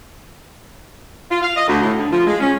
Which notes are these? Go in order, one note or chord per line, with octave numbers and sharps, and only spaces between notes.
F4
F5
D#5
D2
A2
D3
F3
G#3
C#4